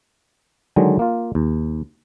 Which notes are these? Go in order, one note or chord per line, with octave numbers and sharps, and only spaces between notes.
D3 D#3 F#3 G#3
A#3 F4
D#2